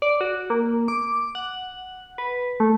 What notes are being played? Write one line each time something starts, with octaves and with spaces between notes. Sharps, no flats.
D5
F#4
A#3
D6
F#5
B4
A3